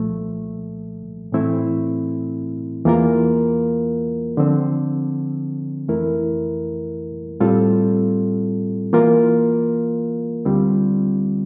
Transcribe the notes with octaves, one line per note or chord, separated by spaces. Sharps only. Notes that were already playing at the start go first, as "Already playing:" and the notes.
Already playing: C2 A#2 F3 A3
A2 E3 A3 C4 E4
E2 E3 A#3 F4 A#4
D3 F3 C4
F2 E3 A3 E4 A#4
A2 G3 C4 F4 A4
E3 A#3 F4 A#4
D2 D3 G3 C4 F4